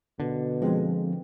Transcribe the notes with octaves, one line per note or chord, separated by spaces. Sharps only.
B2 D3
F3 G#3 C4